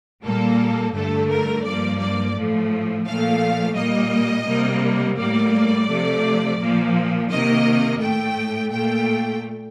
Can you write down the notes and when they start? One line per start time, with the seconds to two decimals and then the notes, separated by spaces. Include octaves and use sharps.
0.24 A#2 G3 A#3 A4
0.94 G2 D3 A3 A4
1.29 A#4
1.65 G2 F3 A#3 D5
2.00 D5
2.36 A2 F3 A3
3.06 A#2 F3 A3 F5
3.76 A#2 G3 A#3 D#5
4.47 C3 G3 A#3
5.18 A2 G3 A#3 D5
5.89 C3 F3 A3
6.60 A#2 F3 A#3
7.30 C3 D#3 A#3 D#5
8.01 A2 A3 G5
8.72 A#2 A3 G5